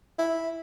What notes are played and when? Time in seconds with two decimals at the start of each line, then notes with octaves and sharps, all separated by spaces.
0.19 E4